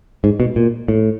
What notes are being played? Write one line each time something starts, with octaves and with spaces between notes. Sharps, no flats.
G#2
B2
A#2
A2